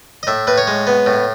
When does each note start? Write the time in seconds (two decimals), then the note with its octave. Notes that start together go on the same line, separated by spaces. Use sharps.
0.23 D#5
0.27 A2 E5
0.47 A2 B4
0.58 C#5
0.67 G#3
0.87 B3
1.06 A2